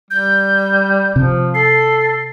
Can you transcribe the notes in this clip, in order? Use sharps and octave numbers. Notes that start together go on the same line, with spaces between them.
G3 G6
C3 F3
A4 C7